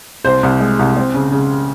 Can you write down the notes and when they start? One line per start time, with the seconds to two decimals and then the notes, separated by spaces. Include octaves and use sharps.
0.24 C2 C5
0.43 C2
0.60 G#3
0.79 C2
0.97 C4
1.14 C#3
1.32 C#3